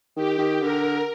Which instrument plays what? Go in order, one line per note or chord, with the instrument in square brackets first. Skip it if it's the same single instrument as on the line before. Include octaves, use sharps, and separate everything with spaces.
[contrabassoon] D#3 [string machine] G4
[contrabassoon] D#3
[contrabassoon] D3 [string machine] A#4